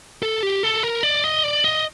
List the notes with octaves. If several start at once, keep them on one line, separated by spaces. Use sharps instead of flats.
A4
G4
A4
A#4
D5
D#5
D5
D#5